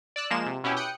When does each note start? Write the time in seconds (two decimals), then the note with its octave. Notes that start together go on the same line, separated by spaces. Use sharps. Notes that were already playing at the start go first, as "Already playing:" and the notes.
0.16 D5 E6 F#6
0.31 F3 G#3 A#3 E7
0.46 C3
0.64 B2 C#4 E4 G4
0.77 G5 D#6 F#6 C#7